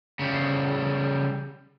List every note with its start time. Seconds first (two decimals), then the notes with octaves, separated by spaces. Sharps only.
0.19 C#3 G3